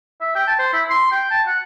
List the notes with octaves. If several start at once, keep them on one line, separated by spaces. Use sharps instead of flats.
E5
G5
A5
C5
E4
C6
G5
A5
F#5